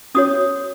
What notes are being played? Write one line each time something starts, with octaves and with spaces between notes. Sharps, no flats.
C#4 F#4 C#5 D#6